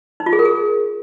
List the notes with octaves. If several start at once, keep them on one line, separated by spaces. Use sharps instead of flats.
D#4
F4
G#4
A#4
G#4